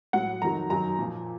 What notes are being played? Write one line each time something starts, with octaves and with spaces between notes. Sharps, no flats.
A2 F#3 F#5
F2 D#3 F#3 A#5
F#2 D#3 F#3 A#5
A#2 F3